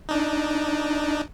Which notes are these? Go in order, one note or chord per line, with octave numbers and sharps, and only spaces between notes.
D4 D#4